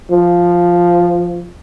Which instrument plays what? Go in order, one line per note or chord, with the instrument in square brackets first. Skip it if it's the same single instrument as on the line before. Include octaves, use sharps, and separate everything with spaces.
[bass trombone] F3